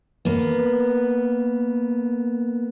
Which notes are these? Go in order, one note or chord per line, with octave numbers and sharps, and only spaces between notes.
A#3 B3